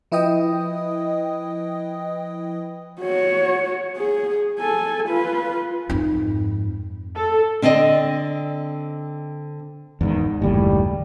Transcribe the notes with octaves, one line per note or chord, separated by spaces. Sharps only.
F3 E4 B4 D#5 G5 D#6
F#4 C#5
G#4
A4 G#5
F4 B4
F2 G#2
A4
D3 C4 D5 D#5
E2 G#2 D#3
F#1 D#2 A2 G3